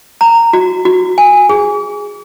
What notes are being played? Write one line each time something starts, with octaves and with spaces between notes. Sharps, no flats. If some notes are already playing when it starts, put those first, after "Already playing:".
A#5
F#4
F#4
G#5
G#4